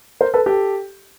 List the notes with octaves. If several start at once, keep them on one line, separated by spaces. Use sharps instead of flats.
A#4 C5
A4 B4
G4 A4